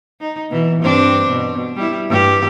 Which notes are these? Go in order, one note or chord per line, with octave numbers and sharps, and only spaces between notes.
D#4
B2 E3
G2 C4 D4
B2
G3 E4
G2 G4